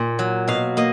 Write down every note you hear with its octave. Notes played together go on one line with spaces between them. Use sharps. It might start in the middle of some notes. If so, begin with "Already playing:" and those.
Already playing: A#2
F#3
B2 F5
A#3 D#5